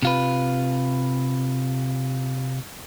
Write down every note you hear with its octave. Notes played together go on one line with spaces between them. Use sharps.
C3 F4 B4